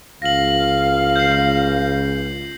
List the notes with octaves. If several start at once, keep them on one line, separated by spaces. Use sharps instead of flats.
C#2 F5 A#6 F#7
G6 C7